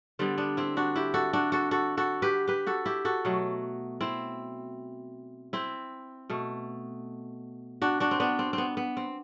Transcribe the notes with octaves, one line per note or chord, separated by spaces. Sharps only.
D3 G3 B3 C4
B3 D4
C4 E4
D4 F#4
E4 G4
F#4 A4
D4 F#4
F#4 A4
F#4 A4
F#4 A4
G4 B4
G4 B4
F#4 A4
E4 G4
F#4 A4
B2 F#3 A3
C4 E4
C4 E4
B2 A3
D4 F#4
D4 F#4
C4
B3 D4
C4
C4
B3
B3
C4